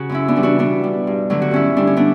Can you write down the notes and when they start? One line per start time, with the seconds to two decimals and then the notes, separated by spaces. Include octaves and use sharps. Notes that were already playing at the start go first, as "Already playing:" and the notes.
Already playing: C#3 F#4
0.09 F#2 C#4 E4
0.28 B3 D4
0.36 C#3 E3 G3
0.43 D4 F#4
0.59 B2 B3 D4
0.84 G3
1.07 G2
1.30 D3 F#3 A3
1.42 F#4
1.51 G2 C#4 E4
1.77 D3 G3 D4
1.87 C#4
1.97 B3 D4